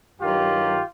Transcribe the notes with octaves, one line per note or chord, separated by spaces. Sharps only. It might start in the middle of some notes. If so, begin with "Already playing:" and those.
G2 D#3 F#3 F4 G4